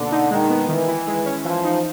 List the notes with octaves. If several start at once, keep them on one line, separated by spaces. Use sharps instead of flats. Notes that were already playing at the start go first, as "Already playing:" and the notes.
Already playing: B2 D3 A#3
D#4
D#3 G#3
B3
D#3 E3
E4
G#3
C#4
E3 F3
D#4